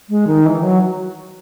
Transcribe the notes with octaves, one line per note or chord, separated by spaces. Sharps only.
G#3
D#3
E3
F#3